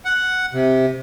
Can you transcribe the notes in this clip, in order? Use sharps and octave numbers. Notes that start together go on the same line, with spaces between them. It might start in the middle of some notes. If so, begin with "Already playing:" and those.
F#5
C3